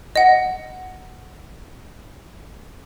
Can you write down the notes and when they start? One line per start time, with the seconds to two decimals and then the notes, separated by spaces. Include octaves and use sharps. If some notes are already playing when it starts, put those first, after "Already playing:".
0.16 D#5 F#5